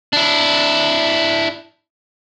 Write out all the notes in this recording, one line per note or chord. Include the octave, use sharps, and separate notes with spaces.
D4 E4